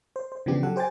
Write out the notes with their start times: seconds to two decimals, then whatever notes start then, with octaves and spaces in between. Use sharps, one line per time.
0.16 C5
0.32 C5
0.46 C#3 E3 F3 B3 D4 G4
0.63 F#3 A4 F#5
0.76 G4 C5 G5 G#5 A6